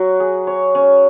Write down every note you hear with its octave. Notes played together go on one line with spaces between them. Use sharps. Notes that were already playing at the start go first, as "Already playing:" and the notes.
Already playing: F#3 F#4
G#4
C#5
C#4